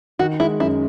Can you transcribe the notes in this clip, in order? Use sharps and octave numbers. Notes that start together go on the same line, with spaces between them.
D#3 F#4
G#3 E4
F#2 E4